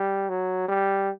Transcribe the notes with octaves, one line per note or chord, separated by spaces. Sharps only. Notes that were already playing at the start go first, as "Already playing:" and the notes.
Already playing: G3
F#3
G3